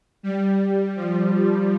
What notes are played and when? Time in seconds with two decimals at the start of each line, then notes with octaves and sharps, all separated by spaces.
0.23 G3
0.96 F3